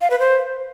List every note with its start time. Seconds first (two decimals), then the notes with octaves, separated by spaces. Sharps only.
0.01 F5
0.10 B4
0.20 C5